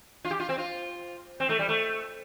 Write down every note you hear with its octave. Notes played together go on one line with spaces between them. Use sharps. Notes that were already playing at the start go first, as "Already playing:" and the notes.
F4
G4
F4
C4
F4
C4
A3
G3
A3